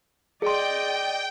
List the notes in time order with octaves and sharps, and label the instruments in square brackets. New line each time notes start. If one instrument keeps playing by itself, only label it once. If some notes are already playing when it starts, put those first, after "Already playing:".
[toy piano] G#4 C6 [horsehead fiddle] D5 D#5 [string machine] G5